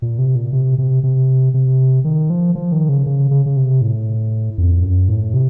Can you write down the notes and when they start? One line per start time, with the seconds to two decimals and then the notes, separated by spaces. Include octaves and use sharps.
0.02 A#2
0.19 C3
0.35 A#2
0.53 C3
0.78 C3
1.03 C3
1.54 C3
2.04 D#3
2.30 F3
2.55 F3
2.72 D#3
2.89 C#3
3.06 C#3
3.31 C#3
3.46 C#3
3.57 C3
3.81 A2
4.58 F2
4.83 F#2
5.08 A2
5.34 C3